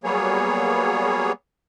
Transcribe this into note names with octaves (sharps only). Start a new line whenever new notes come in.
F#3 G3 A#3 B3 G#4 C#5